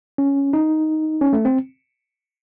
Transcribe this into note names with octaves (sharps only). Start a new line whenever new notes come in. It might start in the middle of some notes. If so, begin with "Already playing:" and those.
C#4
D#4
C#4
A3
C4